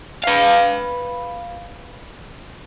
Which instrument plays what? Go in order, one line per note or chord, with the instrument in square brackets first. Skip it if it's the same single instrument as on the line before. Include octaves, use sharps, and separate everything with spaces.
[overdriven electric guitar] B4 F5